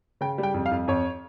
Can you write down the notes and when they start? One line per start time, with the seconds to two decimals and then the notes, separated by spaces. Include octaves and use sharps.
0.21 C#3 G5
0.38 G3
0.43 G5
0.54 F2
0.66 F5
0.71 F2
0.88 F2 C#5